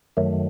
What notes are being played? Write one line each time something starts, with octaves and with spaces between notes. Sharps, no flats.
F#2 D#3 F#3 A3